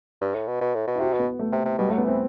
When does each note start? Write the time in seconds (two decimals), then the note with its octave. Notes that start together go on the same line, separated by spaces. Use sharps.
0.21 G2
0.34 A2
0.47 B2
0.61 B2
0.74 A2
0.87 B2
0.95 E4
1.00 C3 F#4
1.13 B2
1.19 B3
1.39 A3
1.52 C3
1.65 C3
1.78 B2 G3
1.89 A3
1.92 F#3
1.98 B3
2.05 E3 C4